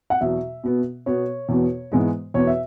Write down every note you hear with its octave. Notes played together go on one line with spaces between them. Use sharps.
F#5
E2 B2 F#3 E5
B2 B3
B2 B3 C#5
E2 B2 B3
G#2 E3 G#3 B3
E2 B2 B3 C#5
E5